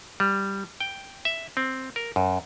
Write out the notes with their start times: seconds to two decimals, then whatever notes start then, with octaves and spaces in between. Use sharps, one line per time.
0.20 G3
0.80 G5
1.25 E5
1.57 C4
1.96 A#4
2.16 F#2